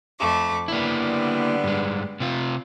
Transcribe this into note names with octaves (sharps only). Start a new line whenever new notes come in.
F2 A3 D6
D3 G3 A#3 B3 E4
G2 G#3
C3 F4